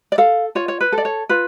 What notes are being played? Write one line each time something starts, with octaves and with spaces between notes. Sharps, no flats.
D5
A4 F5
F4 C#5
C#5
B4
A4
D5
C#5
F4 B4